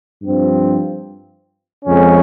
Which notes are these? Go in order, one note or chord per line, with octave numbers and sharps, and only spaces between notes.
G2 F3 C4
F2 C#3 G#3 C#4